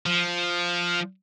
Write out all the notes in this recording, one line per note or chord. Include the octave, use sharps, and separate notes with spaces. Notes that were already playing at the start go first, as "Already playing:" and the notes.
F3